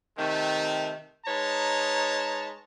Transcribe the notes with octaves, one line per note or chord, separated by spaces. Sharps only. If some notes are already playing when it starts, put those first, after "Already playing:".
C3 D#3 A3
G#3 D#4 B4 C#5 A5 A#5